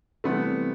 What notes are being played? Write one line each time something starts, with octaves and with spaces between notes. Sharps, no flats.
C3 E3 G3 A3 B3 C4 E4